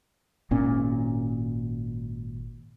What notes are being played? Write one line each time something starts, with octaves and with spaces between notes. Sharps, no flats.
G#1 A#2 C#4